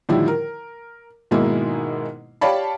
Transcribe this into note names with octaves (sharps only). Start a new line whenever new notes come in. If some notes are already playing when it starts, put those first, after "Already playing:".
A2 D3 D#3 F3 G3 E4
A#4
G#2 B2 D#3 G#3 A#3 E4
G4 C#5 D5 F5 A5 B5